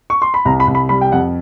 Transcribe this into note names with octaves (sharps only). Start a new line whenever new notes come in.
C#6
C6
B5
C2 A#5
B5
C2
B5
G3 B5
G5
F2 F#5